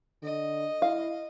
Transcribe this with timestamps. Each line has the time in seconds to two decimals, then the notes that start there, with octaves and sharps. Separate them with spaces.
0.23 D3 D#5
0.82 E4 F5